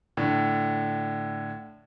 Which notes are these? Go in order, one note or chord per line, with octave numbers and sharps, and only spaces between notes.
A2 D3